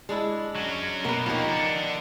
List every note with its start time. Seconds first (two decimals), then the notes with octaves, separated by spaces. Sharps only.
0.09 G#3 D4 E4
0.56 F#3 C#4
1.04 B2 A#3 B4
1.26 F3 A#3 D#4 G4
1.49 D5 F#5